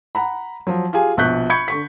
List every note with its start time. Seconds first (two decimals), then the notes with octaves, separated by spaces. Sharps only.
0.15 F#5 A#5 B5
0.67 F3 F#3
0.93 F4 G4 G#4 G#5
1.17 A#1 B2 C#6 F#6 G6 B6
1.50 B5 C#6 G6 G#6 C#7
1.68 D3 C#6 B6